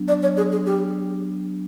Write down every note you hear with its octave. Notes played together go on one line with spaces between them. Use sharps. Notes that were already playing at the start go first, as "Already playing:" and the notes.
Already playing: F#3 B3 D4
D5
C#5
G#4
G#4
G4